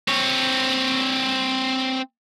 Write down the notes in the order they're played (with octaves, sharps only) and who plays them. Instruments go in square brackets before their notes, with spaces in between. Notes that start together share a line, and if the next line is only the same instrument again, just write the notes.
[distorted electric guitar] C4 C#5